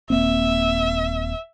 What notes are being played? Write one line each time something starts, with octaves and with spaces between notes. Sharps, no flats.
D#1 A#3 C4 E5